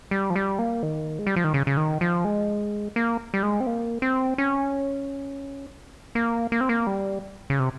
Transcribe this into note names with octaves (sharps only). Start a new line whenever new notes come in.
G3
F3
G3
A#3
D#3
G#3
G3
F3
D#3
C#3
C#3
D#3
F3
G#3
A#3
G3
G#3
C4
A#3
C4
C#4
A#3
A#3
C4
A#3
G3
C#3
C3